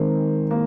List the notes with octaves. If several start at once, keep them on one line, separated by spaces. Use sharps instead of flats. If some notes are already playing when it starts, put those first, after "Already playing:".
Already playing: D#3 G#3 C4 D#4 A#4
A#3